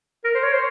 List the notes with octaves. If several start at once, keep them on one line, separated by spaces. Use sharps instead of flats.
A#4
C5
C#5
C5